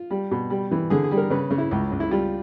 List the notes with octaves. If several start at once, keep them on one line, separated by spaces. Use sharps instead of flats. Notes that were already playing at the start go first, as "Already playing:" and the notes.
Already playing: F4
G3
B2
G3
E3
D3 G#4
G#4
G3
A#4
C#3 B4
C#3
E4
C#2
C#2
E4
G3 F4